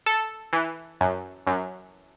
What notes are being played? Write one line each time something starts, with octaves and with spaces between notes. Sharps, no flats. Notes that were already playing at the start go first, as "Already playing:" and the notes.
A4
E3
F#2
F#2